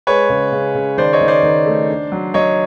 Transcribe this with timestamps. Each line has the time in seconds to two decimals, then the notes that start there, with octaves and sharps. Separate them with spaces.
0.07 G#3 B4 C#5
0.29 C#3
0.53 C#3
0.75 C#3
0.98 D#3 C5 D5
1.13 C#5 D#5
1.21 D#3
1.28 C5 D5
1.43 D#3
1.66 A3
1.89 D4
2.12 F#3
2.34 F#3 C#5 D#5